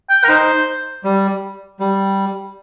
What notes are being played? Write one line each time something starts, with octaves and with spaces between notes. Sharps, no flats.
G5
A#4
D#4 C5
G3
G3